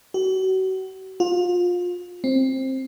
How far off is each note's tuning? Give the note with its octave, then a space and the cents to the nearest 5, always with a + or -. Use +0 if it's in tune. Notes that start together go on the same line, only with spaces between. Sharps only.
F#4 +35
F4 +25
C4 +15